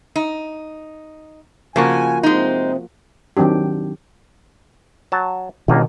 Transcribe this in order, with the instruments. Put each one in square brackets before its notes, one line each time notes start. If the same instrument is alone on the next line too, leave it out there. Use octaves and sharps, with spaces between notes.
[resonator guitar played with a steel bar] D#4
[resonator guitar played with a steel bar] C#3 [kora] F3 A#3 F#4 [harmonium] G#5
[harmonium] C3 [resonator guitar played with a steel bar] G#3 D#4
[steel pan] D#3 F#3 C4 D4 G4
[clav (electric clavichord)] F#3 A5
[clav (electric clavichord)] G1 C#2 A#3 [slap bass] B2 D#3